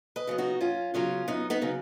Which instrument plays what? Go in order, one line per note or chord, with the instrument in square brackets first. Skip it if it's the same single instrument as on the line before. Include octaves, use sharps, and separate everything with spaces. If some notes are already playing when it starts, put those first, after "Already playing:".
[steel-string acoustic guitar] B4 D#5
C#3 F#3 B3
D#4 F#4
F#2 C#4 F4
C#3 F#3 B3 C#4 F4
F#2 B3 D#4
B3 D#4
C#3 F#3 B3